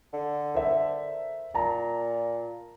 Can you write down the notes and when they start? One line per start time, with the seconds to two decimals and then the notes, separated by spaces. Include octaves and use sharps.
0.13 D3
0.54 A#4 C5 E5
1.55 A#2 A5 A#5